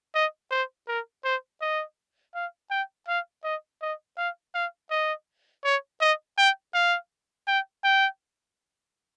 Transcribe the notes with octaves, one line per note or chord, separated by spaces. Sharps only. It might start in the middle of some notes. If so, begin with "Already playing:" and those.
D#5
C5
A#4
C5
D#5
F5
G5
F5
D#5
D#5
F5
F5
D#5
C#5
D#5
G5
F5
G5
G5